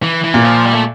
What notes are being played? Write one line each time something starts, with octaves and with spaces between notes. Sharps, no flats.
E3
E3
A#2
F3
G3
A3